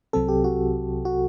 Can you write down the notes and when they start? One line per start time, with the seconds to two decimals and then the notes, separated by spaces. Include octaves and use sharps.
0.13 C2 C3 F#3 C4 A4
0.28 G4
0.44 F#4
1.05 F#4